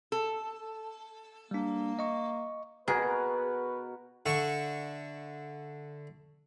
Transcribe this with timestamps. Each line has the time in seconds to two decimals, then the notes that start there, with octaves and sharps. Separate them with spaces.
0.12 A4
1.51 G3 A#3 D4
1.99 D#5 C#6
2.88 B2 F#4 G#4 A#4 B4
4.26 D3 E5 C#6